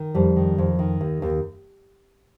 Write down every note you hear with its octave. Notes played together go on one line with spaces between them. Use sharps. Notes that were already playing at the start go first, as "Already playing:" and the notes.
Already playing: D#3
F2 G3
D#3
F2
D#3
D#2
D#2